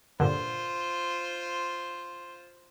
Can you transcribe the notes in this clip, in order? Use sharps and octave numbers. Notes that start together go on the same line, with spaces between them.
G2 A#2 D3 F4 C5